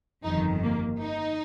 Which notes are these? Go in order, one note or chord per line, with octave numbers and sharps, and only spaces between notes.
G1 F2 D#3 D#4
A#3
D#4